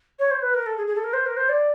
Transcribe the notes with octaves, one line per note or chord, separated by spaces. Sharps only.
C#5
C5
B4
A#4
A4
G#4
G#4
A4
A#4
C5
A#4
C5
D5